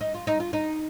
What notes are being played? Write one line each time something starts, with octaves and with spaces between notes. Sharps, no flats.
D#4
F4
D#4
F4
D#4